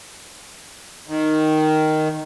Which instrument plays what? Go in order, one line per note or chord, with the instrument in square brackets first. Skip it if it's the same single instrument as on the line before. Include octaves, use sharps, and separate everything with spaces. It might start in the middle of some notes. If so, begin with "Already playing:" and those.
[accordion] D#3